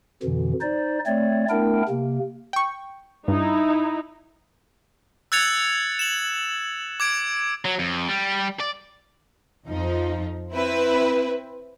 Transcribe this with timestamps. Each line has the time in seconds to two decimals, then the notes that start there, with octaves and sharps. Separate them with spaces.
0.23 F2 B2 D3 E3
0.61 D#4 C5 D5
1.07 A3 C4 C#5 D5
1.50 A3 B3 D4 E4 A#4 G5
1.89 C3 A#3
2.53 G5 C#6
3.28 G2 D#4 E4
5.32 E6 F#6 G#6 A6 C#7 F7
5.99 E7 F#7
7.00 D6 G#6 D7
7.65 F#3
7.79 F2
8.08 G3
8.60 D5
9.67 F2 F3 D#4
10.52 C4 E4 B4